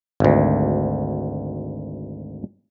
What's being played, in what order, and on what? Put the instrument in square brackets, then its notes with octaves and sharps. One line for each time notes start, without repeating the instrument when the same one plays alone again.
[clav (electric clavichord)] G#1 D2